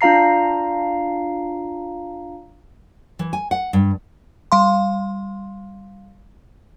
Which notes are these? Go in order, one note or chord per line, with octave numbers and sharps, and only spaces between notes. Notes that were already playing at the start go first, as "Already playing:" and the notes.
D4 F4 F5 A#5 C7
E3
G#5
F#5
G2
G3 F5 C6